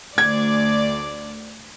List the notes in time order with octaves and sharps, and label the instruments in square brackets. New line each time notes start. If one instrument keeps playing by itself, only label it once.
[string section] D2 D5 [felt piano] G#6